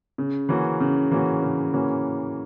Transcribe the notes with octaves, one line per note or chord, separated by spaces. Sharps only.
C#3
E3 A#3 C#4 F#4
C#3
E3 A#3 C#4 F#4
C#3
E3 A#3 C#4 F#4